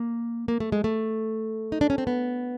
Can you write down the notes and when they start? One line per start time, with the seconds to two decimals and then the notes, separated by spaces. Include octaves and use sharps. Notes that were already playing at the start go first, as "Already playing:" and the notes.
Already playing: A#3
0.48 A#3
0.60 A3
0.72 G#3
0.84 A3
1.72 D#4
1.81 D4
1.90 C#4
1.98 C4
2.07 B3